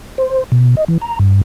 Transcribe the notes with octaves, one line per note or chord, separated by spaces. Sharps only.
C5
B2
D#5
E3
A#5
G2